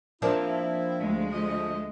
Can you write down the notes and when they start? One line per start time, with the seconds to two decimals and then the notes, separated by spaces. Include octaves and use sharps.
0.22 F3 A#3 C4 D4 E4
1.00 D2 G#3
1.33 F3 A3 D#5